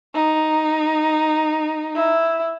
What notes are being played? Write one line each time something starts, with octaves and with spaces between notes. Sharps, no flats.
D#4
E4